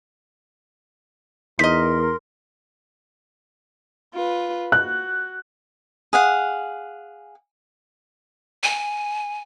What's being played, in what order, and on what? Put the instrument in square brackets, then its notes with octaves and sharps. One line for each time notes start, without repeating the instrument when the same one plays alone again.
[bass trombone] E2 [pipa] D#4 D#5 [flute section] A#4 C6 [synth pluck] B6
[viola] F4 B4
[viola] F#4 [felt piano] F#6
[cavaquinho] G#4 F5 F#5
[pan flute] G#5